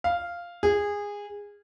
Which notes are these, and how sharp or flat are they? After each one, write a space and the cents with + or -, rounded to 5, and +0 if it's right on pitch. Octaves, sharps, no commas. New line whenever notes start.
F5 -5
G#4 -20